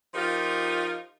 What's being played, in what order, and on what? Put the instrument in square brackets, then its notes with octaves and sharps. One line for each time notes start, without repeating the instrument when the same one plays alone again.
[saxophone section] F3 D#4 F4 G4 A#4